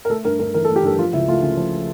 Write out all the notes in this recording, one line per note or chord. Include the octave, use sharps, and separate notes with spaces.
A#4
A3 A4
G2 A#4
G2 A#4
E3 A#4
A3 A4
G4
G2 A4
F3 F4
C#2 E4
A3 F4
C#3
F3